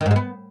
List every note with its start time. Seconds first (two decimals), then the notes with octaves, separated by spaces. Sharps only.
0.01 D#3
0.06 G#2
0.11 G#3
0.16 B3